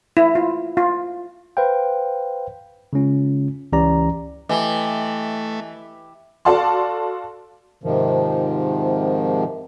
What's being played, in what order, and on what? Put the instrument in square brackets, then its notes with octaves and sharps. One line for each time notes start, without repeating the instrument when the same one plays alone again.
[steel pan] E4
F4
F4
[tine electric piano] B4 C5 F5 G5
C#3 G#3 C#4 F4
C#2 E3 C#4 G4 D5 A#5
[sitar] E3 [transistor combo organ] A3 [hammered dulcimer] G4 [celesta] D#5 G#5 G7
[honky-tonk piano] F#4 A4 D5 F5 A5 C6
[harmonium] G#2 C3 D#3 F3